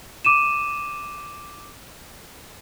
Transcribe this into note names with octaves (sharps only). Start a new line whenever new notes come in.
D6 D#7 E7